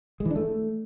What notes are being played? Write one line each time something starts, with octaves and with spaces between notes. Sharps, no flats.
G#3
E3
D4
A3